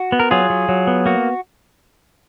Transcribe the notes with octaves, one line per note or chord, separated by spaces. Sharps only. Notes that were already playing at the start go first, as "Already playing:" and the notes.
Already playing: F#4
B3
A#4
F#3 F4 G#4
F#3
F#3
B3
A#3 F#4